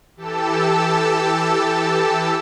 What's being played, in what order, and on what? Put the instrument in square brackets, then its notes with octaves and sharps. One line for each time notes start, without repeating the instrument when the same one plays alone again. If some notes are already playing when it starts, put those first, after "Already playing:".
[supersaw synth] E3 G4 A4 A5 E6